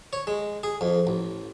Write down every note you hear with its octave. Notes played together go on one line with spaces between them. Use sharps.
C#5
G#3
G#4
F2
A1